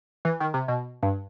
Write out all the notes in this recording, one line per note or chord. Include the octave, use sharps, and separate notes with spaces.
E3
D#3
C3
B2
G2